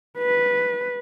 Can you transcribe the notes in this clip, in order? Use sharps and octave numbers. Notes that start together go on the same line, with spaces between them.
B4